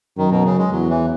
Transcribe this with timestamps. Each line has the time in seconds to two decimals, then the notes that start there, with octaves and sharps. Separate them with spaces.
0.17 F#2 D#3
0.31 B2
0.45 C#3
0.58 G#3
0.72 E2 F#3
0.90 E3